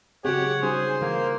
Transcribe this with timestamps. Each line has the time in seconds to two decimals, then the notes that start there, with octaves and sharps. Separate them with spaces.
0.25 C#3 F#3 G#3 C4 G4 C#5 F#5
0.62 G3 C#4 D#4 G#4 C5
1.02 E3 A#3 C4